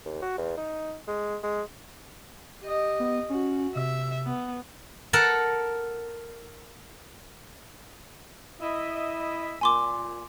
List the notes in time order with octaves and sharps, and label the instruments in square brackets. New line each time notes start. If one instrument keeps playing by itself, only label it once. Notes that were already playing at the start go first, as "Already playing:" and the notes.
[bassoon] D#2
F#4
E2
D#4
G#3
G#3
[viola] G4 D#5
[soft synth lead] B3
[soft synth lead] C#4 [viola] F#4
[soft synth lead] C3 [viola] E5
[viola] B3
[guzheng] A4 A#4 F#5 A5
[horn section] E4 D#5 E5
[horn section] A#2 [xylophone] G#5 C6 D6